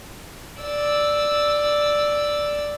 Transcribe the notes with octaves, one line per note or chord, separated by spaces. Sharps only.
D5 E6